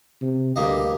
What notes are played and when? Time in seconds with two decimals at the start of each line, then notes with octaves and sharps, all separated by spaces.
0.22 C3
0.56 D2 G2 A#3 D#5